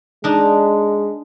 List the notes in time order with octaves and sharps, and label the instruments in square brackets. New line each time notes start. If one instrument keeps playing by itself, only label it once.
[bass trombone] G#3 [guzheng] D4 D#4